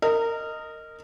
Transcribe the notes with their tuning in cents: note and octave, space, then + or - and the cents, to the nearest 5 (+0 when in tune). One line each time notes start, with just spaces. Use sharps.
A#4 -20 D#5 +0